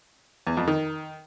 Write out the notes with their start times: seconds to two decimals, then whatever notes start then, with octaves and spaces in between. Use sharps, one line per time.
0.47 E2
0.57 F2
0.67 D#3